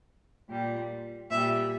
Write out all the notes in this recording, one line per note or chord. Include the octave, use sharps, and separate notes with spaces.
A#2 G3
A#2 G3 E5